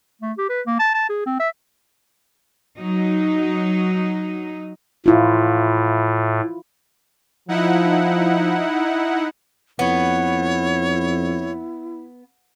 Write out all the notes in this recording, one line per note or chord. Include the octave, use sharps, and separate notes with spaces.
A3
G4
B4
A#3
A5
A5
G#4
C4
E5
F#3 D#4
A2 E4 F4
F3 D#4 E4 F#5
F2 B3 E4 C#5